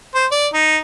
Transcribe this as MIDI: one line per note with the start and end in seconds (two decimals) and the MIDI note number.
0.15 0.26 72
0.32 0.48 74
0.53 0.79 63